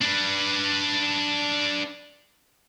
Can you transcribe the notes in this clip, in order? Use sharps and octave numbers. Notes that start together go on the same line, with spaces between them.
D4 B4